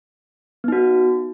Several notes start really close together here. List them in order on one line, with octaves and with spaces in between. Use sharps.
B3 D#4 F#4